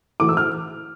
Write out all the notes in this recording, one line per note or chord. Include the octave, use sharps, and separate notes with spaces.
E3 A3 E4 D6
E6
F6